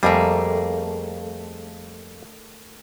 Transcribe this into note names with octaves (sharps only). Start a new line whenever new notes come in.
F2 G3 A3 A#3 G#4